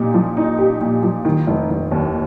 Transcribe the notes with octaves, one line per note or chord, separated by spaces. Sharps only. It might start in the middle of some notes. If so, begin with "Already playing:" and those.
Already playing: A#2 D#4 G4
F3
D#4
G4
A#2
F3
D#3
F1
F1
D#2